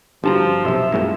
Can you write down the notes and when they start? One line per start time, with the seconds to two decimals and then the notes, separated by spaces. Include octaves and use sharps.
0.24 G1 F3 D4 F#4 G4 A5 A#5
0.65 B1 C3 E5
0.92 F#2 A2 G#3 A#3